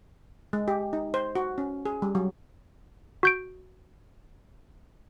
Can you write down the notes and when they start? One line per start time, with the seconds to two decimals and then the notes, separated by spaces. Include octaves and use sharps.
0.53 G#3
0.68 G4
0.93 D#4
1.14 C5
1.35 F#4
1.58 C#4
1.85 G#4
2.02 G3
2.15 F#3
3.23 F#4 G6 D7